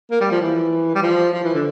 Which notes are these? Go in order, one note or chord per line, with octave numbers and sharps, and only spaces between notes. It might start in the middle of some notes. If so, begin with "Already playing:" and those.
A#3
G3
F3
E3
G3
F3
F3
E3
D3